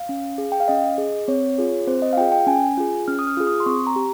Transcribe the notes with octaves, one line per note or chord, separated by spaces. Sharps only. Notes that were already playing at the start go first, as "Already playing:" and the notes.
Already playing: F5
C#4
G#4
G5
F5
C#4 D#5
G#4
C4 C#5
F4 G#4
C4 C5
D#5
F5
F4 G#4 G5
G5
C#4 G#5
F4 G#4
C#4 F6
D#6
F6
F4 G#4
D#6
C6
C4 C#6
A#5
G4